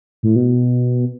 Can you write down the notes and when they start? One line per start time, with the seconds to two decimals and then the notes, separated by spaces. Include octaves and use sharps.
0.23 A2
0.36 B2